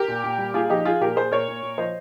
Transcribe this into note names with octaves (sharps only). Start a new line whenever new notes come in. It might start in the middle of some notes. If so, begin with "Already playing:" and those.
Already playing: G4 A#4
A#2
A#2
G3
A#2 F4 G#4
F3 D#4 G4
F3 F4 G#4
A#2 G4 A#4
A#2 G#4 C5
A#2 A#4 C#5
A#2
A#2
F3 C5 D#5